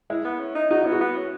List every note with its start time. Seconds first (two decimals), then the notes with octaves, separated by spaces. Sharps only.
0.10 G#3 E4
0.25 B3
0.40 C#4
0.55 D#4
0.70 D#4 F#4
0.82 B3 E4
0.92 F#4
1.01 B3
1.16 C#4